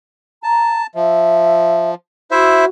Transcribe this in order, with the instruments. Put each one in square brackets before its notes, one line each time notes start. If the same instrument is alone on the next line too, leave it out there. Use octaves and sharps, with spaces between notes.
[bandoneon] A5 [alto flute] A#5
[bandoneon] F3 [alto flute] E5
[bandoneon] E4 C5 E5 [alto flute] F#4